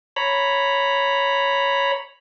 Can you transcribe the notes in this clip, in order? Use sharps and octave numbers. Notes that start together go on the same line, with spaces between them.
C#5 A#5 B5